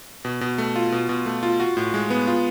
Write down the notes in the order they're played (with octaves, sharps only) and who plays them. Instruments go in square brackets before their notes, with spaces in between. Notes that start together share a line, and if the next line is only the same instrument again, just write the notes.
[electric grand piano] B2
B2
A3
F4
B2
B2
A3
F4
F#4
A2
G#3
B3
F4